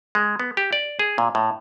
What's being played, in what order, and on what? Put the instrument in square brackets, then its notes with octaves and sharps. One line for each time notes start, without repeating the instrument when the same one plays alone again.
[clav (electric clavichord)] G#3
B3
G4
D5
G#4
A#2
A2